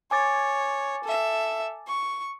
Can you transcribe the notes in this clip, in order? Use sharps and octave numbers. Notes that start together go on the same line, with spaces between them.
C#5 G#5 D6 A6
A4 E5
C#6